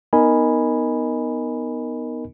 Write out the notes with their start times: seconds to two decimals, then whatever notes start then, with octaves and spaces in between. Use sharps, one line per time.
0.13 B3 D#4 A#4 D#5 G#5 B5